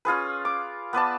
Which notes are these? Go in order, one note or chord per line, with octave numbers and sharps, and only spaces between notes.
C#4 F4 G#4 B4
D6
B3 B4 D5 A5